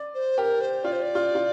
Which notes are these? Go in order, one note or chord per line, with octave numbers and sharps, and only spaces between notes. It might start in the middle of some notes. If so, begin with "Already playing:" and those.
Already playing: D5
C5
G4 A#4
C5
F4 D5
C5
D5
F4
F4